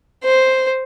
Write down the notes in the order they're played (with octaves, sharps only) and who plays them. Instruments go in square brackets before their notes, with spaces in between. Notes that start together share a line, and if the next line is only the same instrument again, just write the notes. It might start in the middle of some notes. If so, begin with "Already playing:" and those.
[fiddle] C5